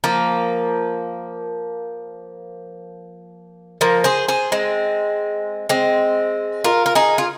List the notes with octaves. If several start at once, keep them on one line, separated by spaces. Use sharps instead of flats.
F3 A#3
F3 A#3
G#4 C5
G#4 C5
G#3 C4
G#3 C4
F4 A#4
A#4
D#4 G#4
F4